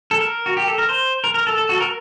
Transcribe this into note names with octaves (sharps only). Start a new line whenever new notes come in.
A4
A#4
F#4
G4
A4
A#4
C5
A#4
A#4
A4
A4
F#4
A4
A#4